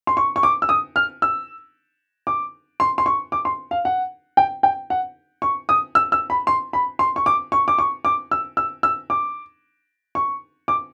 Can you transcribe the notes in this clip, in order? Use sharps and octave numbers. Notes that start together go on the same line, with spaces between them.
C6
C#6
C#6
D6
E6
D#6
F6
E6
D6
C6
C6
C#6
D6
C6
F5
F#5
G5
G5
F#5
C#6
D#6
E6
E6
B5
C6
B5
C6
C#6
D6
C#6
D6
C#6
D6
E6
E6
E6
D6
C#6
D6